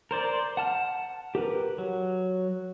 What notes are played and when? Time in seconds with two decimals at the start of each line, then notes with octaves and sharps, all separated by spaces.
0.11 A#4 C5 D5
0.57 F#5 A5 F6
1.35 G4 A#4 B4
1.78 F#3